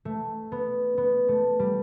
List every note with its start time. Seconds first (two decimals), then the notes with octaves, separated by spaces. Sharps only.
0.05 A3
0.52 B3
0.98 B3
1.29 A3
1.59 G3